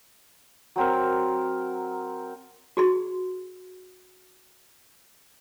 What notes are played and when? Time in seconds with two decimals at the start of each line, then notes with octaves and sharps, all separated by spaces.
0.76 F#3 C4 A#4
2.77 F#4 G#4 C6